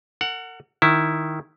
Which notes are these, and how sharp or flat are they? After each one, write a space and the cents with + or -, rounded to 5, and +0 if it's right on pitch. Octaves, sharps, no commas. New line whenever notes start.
A#4 -45 F#5 +0
D#3 +0 E4 +0